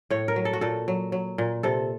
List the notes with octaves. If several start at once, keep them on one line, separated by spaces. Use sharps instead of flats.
A2 C#5
A#4
F#3
A4
F#4
A#2 A4
F#3
F#3
A#2
C3 A4